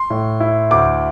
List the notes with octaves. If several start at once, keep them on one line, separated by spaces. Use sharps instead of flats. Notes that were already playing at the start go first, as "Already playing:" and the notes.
Already playing: C6
A2
E4
D2 D6